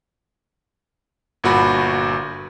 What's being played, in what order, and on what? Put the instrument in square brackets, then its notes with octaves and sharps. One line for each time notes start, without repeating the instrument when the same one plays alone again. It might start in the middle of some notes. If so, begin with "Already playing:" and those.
[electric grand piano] G1 A#2 F#4 B5